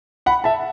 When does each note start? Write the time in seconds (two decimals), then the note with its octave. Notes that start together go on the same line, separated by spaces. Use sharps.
0.26 F#5 B5
0.44 E5 A5